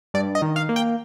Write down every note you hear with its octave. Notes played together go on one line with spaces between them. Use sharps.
G2 D5
D#5
D#3
F5
A#3
G5